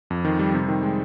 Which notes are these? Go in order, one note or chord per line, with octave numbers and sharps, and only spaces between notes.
F2
D#3
G3
C3
D#3
G#3